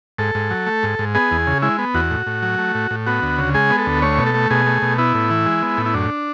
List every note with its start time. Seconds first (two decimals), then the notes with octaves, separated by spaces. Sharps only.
0.18 G#2 A4
0.35 G#2
0.51 F#3
0.67 A3
0.83 G#2
0.99 G#2
1.15 B3 G#4
1.31 E2
1.47 C#3
1.62 G#3 E4
1.79 B3
1.94 E2 F#4
2.11 A2
2.27 A2
2.42 F#3
2.58 A3
2.75 A2
2.91 A2
3.06 B3 F#4
3.22 D2
3.38 C#3
3.54 G#3 G#4
3.70 B3
3.78 A4
3.86 D2
4.02 A3 C#5
4.18 B2
4.26 A4
4.34 A3
4.50 B2 G#4
4.67 A3
4.82 B2
4.98 B3 E4
5.15 A2
5.30 E3
5.46 G#3
5.62 B3
5.78 A2
5.86 E4
5.94 F#2 D4